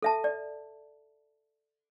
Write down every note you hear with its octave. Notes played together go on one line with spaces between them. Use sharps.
A4 E5 A5
D5